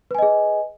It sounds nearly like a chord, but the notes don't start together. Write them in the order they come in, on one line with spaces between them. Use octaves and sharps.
B4 G#5 D#5 G#4